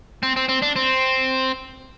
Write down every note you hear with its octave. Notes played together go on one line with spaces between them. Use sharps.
C4
C4
C4
D4
C4